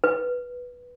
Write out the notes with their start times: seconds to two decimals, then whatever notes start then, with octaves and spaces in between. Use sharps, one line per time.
0.04 B4